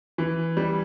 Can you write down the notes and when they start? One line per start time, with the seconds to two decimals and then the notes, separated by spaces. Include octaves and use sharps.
0.18 E3
0.57 G3